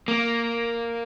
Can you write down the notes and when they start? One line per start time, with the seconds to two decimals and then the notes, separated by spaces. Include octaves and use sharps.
0.08 A#3